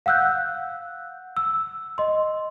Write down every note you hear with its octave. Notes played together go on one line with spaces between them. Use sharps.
F5 F#5 E6 F#6 G6
E6
D#5 C6